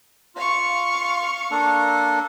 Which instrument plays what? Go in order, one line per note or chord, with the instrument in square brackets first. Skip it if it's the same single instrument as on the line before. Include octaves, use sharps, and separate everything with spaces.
[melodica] F4 [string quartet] F5 C#6
[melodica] A#3 D4 A4